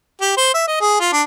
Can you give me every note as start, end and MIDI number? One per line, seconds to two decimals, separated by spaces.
0.21 0.34 67
0.37 0.52 72
0.54 0.65 76
0.67 0.77 75
0.81 0.95 68
1.00 1.10 65
1.13 1.22 62